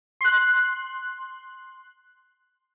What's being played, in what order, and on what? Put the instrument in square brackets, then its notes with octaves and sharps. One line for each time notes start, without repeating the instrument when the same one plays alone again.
[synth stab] C6 F#6